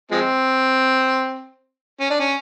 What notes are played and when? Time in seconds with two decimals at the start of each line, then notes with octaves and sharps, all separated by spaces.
0.11 F3 G#3 C4
2.01 C#4
2.11 D4
2.20 C#4